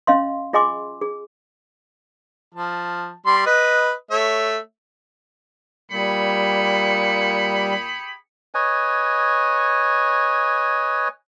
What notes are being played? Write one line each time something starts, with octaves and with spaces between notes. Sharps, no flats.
C#4 D#5 F5 C6
F4 G#4 D#5 G#5 C6 D6
G#4
F3 A5
G3 C6
B4 D#5
A3 C#5 E5
A#2 G3 G4 G#4 B5 C#7
B4 C#5 D#5 G#5